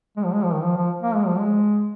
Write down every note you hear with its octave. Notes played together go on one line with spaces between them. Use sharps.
G#3
F3
G#3
F3
D#3
F3
F3
A#3
G#3
F3
G#3